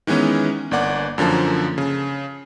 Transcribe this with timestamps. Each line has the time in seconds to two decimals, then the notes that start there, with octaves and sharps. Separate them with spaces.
0.07 D#3 E3 G#3 B3 C#4
0.71 G1 A#3 D5 F#5 D6
1.18 F#2 D3 F3 A#3 A5
1.78 C#3